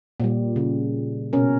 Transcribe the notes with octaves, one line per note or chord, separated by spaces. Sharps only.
A#2 G3
C#3
B2 C#4 A#4